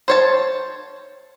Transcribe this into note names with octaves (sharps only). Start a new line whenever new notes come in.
C5 C#5 A5